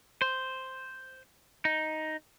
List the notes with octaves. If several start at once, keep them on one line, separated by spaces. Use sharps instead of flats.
C5
D#4